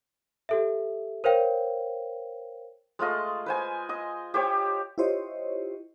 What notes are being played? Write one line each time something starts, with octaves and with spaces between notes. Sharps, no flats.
G4 A4 E5
A#4 C5 C#5 F5 G5
G#3 A3 F4 D#5
B4 C5 G#5
D#5 C6
G4 C5 C#5 G5
E4 F4 G4 C5 C#5 D#5